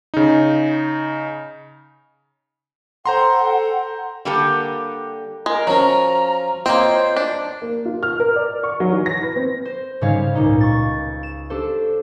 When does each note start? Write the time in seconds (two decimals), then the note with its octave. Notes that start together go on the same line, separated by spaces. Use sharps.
0.14 C#3 D#4
3.06 A4 C5 F#5 G5 A#5 C6
4.25 D3 G3 A#3 G4 A4
5.46 G#3 A#4 A#5
5.67 F3 F#3 C#4 A#5
6.66 A#3 C4 F4 C5 C#5 D#5 G5 A#5
7.16 D4
7.62 A#3
7.85 F4
8.03 F6
8.20 A#4
8.36 D5
8.64 C#6
8.80 F#3
8.92 E3
9.06 A#6
9.23 B4
9.36 C4
9.65 C5
10.01 G#2 C#3 G3 C#4 C#5 F5
10.35 C#2 A#2 D#4
10.61 C#6 A6
11.23 E7
11.50 D4 G4 A4 C5